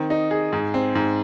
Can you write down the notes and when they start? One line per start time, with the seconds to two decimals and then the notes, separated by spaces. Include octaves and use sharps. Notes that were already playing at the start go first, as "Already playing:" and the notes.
Already playing: D#3 C4
0.10 D#4
0.31 G#4
0.53 G#2
0.74 C4
0.95 G#2